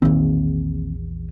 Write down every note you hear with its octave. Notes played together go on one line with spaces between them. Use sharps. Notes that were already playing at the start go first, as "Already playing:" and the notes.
A#1 E2 D#3 A#3 C4